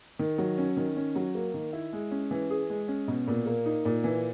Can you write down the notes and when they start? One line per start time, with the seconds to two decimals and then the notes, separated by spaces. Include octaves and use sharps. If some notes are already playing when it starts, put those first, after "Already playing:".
0.19 D#3
0.38 F#3
0.58 C#4
0.77 D#3
0.96 C#4
1.15 F#3
1.35 A#3
1.54 D#3
1.73 E4
1.93 G#3
2.11 C#4
2.31 E3
2.50 G#4
2.70 G#3
2.88 C#4
3.08 B2
3.27 A#2
3.46 A#3
3.66 D#4
3.85 A#2
4.04 E3